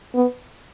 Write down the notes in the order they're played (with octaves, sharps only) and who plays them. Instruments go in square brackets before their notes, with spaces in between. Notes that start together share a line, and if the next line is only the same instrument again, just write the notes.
[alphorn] B3